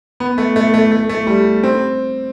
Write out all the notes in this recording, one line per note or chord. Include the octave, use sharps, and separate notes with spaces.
B3
A3
A3
A3
A3
A3
G3
C4